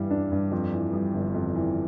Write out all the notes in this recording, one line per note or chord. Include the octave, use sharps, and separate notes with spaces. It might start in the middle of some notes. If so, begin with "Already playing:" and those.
Already playing: G2 E3 G3
D4
G2
F2
E3
G3
G1
F2
E3